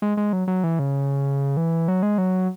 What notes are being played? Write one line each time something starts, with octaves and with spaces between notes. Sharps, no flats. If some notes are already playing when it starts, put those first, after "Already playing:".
G#3
G#3
F#3
F#3
E3
C#3
E3
F#3
G#3
F#3